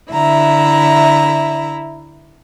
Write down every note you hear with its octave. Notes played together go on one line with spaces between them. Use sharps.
D3 E4 E5 A#5